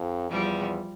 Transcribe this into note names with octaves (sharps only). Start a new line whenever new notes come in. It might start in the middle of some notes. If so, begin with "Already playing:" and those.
Already playing: F2
E2 F3 G3